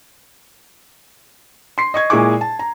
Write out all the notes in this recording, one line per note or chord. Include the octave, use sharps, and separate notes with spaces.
C6 C7
D#5 C#6 G#6
A#2 G#3 E4 G#4 C#6 D6
A5
A#5